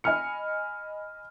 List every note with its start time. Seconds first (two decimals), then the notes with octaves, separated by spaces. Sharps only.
0.04 D#5 G#5 B5 F6 C#7